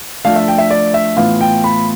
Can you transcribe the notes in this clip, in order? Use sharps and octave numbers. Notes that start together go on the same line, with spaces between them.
F3 A3 D4 F5
E5
G5
E5
D5
E5
A2 E3 B3 F4 F5
G5
B5